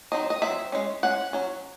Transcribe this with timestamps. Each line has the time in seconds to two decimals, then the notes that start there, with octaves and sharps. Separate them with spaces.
0.12 F#3 C4 D#4 D#5
0.30 D#5
0.42 F#3 C4 E5
0.72 G#3 C#4
1.03 G#3 C#4 F#5
1.33 F#3 C#4